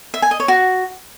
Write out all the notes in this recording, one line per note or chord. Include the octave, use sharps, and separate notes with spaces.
E5
G#5
D#5
C#5
F#4